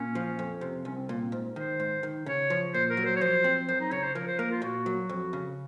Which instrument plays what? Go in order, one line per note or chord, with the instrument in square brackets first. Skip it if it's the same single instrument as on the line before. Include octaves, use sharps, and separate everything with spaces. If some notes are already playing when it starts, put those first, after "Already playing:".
Already playing: [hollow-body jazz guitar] A#2 [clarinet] C#4
[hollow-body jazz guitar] F3
F2
C3
[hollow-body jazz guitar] C2 [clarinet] C#4
[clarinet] C4
[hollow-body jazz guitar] A#2 [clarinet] A#3
[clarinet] C4
[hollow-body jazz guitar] G#2
[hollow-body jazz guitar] D#3 [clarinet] C5
[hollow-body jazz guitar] G#2
D#3
[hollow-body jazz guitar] C#3 [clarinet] C#5
[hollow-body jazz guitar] F3
[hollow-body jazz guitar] A#2 [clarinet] C5
[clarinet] A#4
[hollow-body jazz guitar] F#3
[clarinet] C5
C#5
[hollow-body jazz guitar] F3 [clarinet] C5
[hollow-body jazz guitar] C4
[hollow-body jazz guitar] F#2 [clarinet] C5
[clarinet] D#4
[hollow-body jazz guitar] C#3 [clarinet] C#5
[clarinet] C5
[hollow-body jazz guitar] F3 [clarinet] A#4
[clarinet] C5
[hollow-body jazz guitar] A#3 [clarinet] A#4
[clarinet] F4
[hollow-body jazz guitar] A#2 [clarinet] F#4
[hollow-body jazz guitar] F#3
F2
C#3